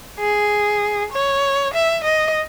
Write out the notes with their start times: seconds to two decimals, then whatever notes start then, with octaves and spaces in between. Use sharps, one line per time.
0.19 G#4
1.12 C#5
1.74 E5
2.04 D#5